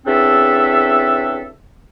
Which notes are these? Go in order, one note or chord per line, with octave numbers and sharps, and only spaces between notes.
E2 C#3 C4 D4 A4 E5